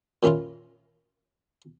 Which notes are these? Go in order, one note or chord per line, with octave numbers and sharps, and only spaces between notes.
A#2 D#3 C#4 E4 F4